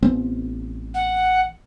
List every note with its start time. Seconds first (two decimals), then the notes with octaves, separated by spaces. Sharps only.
0.03 A1 B3 C4
0.94 F#5